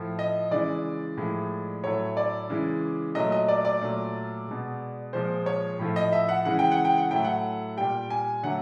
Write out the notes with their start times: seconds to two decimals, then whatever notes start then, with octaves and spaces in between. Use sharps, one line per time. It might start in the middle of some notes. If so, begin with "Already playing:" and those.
Already playing: A2 F3 A3
0.19 D#5
0.51 C#3 E3 G#3 D5
1.17 A2 F3 G#3
1.84 A2 F#3 A3 C#5
2.17 D5
2.49 C#3 E3 G#3
3.15 A#2 F#3 A3 D#5
3.32 D#5
3.48 D5
3.65 D5
3.81 A#2 F#3 A3
4.47 B2 G#3
5.13 A#2 F3 G#3 C5
5.46 C#5
5.79 A2 F3 A3
5.96 D#5
6.13 E5
6.29 F#5
6.45 C#3 E3 G#3 F#5
6.59 G5
6.72 F#5
6.85 G5
6.98 F#5
7.11 A2 F#3 A3 G5
7.25 F#5
7.77 A#2 G3 G5
8.10 G#5
8.43 D3 F#3 A3 F#5